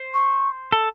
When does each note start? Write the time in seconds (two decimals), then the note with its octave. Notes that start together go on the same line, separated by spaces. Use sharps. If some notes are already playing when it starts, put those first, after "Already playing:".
Already playing: C5
0.14 C#6
0.72 A4